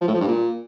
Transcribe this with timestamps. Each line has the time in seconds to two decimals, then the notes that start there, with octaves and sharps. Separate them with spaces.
0.01 F3
0.08 A2
0.14 F3
0.21 G2
0.28 A#2